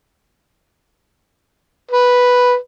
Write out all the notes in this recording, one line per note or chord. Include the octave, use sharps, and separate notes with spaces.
B4